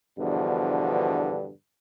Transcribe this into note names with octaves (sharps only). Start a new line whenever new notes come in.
E2 G2 B2 D3 F3